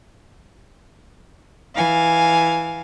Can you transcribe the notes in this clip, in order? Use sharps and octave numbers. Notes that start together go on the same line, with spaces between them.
E3 F5 G#5